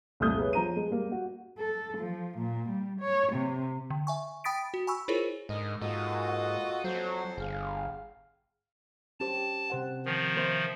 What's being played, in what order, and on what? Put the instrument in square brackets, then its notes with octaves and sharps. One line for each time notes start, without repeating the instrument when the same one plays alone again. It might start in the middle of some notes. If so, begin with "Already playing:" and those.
[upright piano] C2 F2 A#2 A3 D#6 G6
G#4 B4 C#5
F3 A#5 D#7
G#3
G3 A#3
F#4
[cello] A4
F3
A#2
G3
C#5
C3
[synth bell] D3
E5 G#5 C#6
G5 B5 D#6 A6 B6 D7
F#4
G#5 B5 C#6 E6
E4 F4 G#4 A#4 C5 C#5
[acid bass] G#2 [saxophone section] D3 A#4 D#5
[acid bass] G#2 [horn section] A#3 F#4 [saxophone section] F4 A4 D#5
[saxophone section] F2 C5 [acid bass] F#3
[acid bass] G1 [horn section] G#4 F5
[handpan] C#4 G4 C5 [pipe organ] A5
[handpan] C3 C5 F#5
[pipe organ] D#3 F3
[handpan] A#3 C5 E5